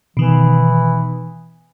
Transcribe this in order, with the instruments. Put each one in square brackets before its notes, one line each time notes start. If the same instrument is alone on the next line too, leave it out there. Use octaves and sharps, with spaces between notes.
[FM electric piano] B2 D#3 [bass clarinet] E3